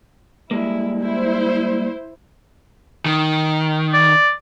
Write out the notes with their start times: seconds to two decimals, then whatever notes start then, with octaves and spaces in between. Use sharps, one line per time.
0.51 G3 G#3 A#3 E4
1.00 E4 C5
3.06 D#3
3.93 D5